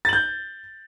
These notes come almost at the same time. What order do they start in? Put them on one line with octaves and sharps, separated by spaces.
A6 F#7 G6